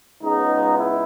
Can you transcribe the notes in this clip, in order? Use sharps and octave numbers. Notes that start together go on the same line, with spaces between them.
C#2 C#3 G#3 B3 D#4
E4